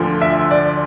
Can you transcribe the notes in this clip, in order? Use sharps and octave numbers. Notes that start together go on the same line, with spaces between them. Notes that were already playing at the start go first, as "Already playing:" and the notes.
Already playing: D2 D3 F3
E5
D5